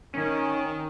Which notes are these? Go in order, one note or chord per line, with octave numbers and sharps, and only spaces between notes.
D#3 C#4